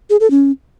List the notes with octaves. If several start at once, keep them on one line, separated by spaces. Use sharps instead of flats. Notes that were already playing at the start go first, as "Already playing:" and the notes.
G#4
A4
C#4